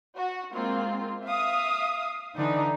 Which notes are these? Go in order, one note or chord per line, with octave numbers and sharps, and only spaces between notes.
F#4
G#3 A#3 C4 F4
E5 F5 D#6
D3 E3 D4 D#4